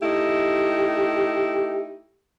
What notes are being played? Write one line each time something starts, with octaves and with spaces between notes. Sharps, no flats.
A3 D#4 E4 G4